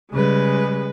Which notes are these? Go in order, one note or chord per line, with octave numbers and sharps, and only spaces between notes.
C#3 G3 G#3 B4